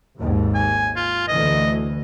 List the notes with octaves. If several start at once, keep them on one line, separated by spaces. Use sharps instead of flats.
G#1 D#2 G#2
G#5
F4
D2 E3 D#5